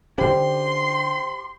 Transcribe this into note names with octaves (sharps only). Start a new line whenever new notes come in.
D3 C#4 G4 C5 C6